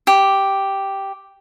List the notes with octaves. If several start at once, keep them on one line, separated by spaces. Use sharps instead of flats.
G4